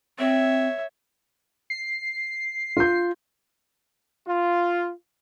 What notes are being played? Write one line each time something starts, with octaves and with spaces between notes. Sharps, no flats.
C4 C#5 E5
C7
F4 G6
F4